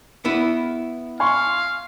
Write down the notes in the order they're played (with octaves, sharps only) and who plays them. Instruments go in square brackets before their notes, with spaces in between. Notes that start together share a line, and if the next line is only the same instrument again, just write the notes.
[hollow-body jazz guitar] B3 E4
[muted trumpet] F5 [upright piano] G#5 C6 C#6